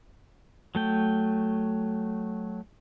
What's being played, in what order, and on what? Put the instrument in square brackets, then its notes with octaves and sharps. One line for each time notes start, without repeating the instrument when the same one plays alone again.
[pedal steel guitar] F#3 A3 G5